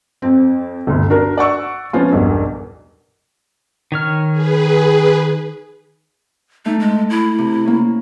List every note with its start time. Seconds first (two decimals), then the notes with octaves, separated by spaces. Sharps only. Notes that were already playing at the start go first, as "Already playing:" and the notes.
0.22 F2 C4
0.87 G1 D2
1.10 D4 F#4 A#4
1.37 D5 F#5 C#6 E6
1.93 F3 B3 C#4 F4
2.12 E1 B1 G2
3.92 D#3 C#5 F6
4.31 G#4 B4
6.66 A3 D#4
6.80 G#3
7.10 E4
7.38 C3
7.65 A#3 C#4